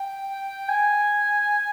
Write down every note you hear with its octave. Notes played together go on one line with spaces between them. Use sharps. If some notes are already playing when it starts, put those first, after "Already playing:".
Already playing: G5
G#5